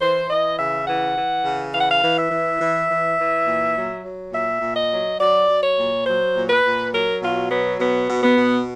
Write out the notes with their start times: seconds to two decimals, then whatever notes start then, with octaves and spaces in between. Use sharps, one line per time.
0.01 E3 C5
0.29 E3 D#5
0.58 C#3 E5
0.87 E3 F#5
1.15 E3
1.44 C#3
1.74 E3 F5
1.81 F#5
1.89 F5
2.03 E3
2.17 E5
2.31 E3
2.61 E3
2.90 E3
3.18 E3
3.47 A#2
3.76 F#3
4.04 F#3
4.33 A#2 E5
4.62 A#2
4.76 D#5
4.91 F#3
5.20 F#3 D5
5.48 F#3
5.63 C#5
5.78 A#2
6.06 F#3 C5
6.36 A#2
6.50 B4
6.64 A#2
6.93 F#3 A#4
7.22 B2 F4
7.50 F#3 B3
7.79 B2 B3
8.09 B2
8.23 B3
8.37 B2